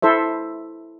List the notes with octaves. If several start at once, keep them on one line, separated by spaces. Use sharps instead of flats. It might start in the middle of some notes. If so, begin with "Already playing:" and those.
E4 A4 C5 E5